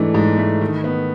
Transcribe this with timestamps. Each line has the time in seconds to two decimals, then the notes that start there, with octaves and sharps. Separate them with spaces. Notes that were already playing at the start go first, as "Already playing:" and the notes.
Already playing: G#2 E3 A3 D4
0.14 G#2
0.38 A3
0.61 D#3
0.84 B3